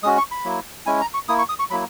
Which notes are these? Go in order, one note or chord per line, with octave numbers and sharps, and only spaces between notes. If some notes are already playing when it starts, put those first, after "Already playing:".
G#3 C#4 F#4 D#6
C#6
B5
F#3 A#3 E4
G#3 C#4 E4 G#5
A#5
C#6
A#3 E4 D#6
C#6
D#6
C#6
F#3 A#3 E4 B5